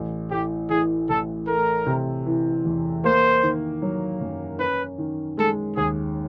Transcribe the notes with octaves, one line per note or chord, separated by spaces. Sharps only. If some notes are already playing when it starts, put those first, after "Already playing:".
Already playing: A1
A2 G4
E3 G#4
A1 A4
A3 A#4
C3
E3
E2
A#3 C5
D#3
F#3
F#2
C#4 B4
D#3
G#3 A4
D#2 G#4